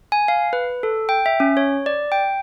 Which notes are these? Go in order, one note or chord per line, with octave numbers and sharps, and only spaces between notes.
G#5
F5
B4
A4
G5
E5
C#4
C#5
D5
G5